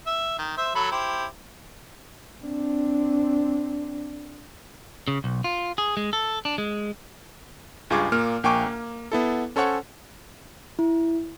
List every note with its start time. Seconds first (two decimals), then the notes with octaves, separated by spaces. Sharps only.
0.07 E5
0.39 D#3
0.58 C5 E5
0.75 F#3 A4 B5
0.92 E4 G4 C5
2.45 C4 D4
5.08 C#3
5.24 B1
5.44 F4
5.78 G#4
5.97 G#3
6.13 A4
6.45 D4
6.58 G#3
7.90 C#2 G2 F4 G#4 C#6 D6
8.12 A#2 A#3 F6
8.44 A#1 A#3 G5 G#5 C#6 D6
8.66 A#3
9.12 B3 E4 A4
9.56 C#4 A4 C5 C#5 F#5 C#6
10.79 E4